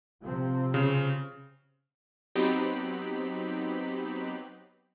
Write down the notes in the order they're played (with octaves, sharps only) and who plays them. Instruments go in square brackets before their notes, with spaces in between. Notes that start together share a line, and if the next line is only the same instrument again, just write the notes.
[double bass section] C3 F3 C4
[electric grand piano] C#3
[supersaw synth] F#3 B3 C4 D#4 G4 B5